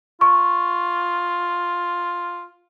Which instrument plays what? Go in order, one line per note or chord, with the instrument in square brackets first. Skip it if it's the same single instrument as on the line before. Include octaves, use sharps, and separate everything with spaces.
[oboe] F4 [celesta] C#6